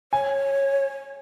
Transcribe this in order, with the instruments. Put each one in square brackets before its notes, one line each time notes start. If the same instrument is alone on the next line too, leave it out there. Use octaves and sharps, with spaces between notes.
[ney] C#5 [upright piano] G#5